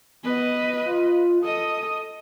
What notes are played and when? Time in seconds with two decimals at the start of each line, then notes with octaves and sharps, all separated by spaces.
0.23 B3 B4 D#5
0.86 F4
1.43 A4 D#5 D#6